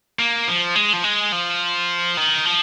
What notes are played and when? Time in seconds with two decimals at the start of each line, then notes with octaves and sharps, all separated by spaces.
0.19 A#3
0.48 F3
0.75 G#3
0.93 F3
1.04 G#3
1.32 F3
2.17 D#3
2.46 F3